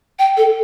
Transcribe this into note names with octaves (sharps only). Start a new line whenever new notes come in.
G5
A4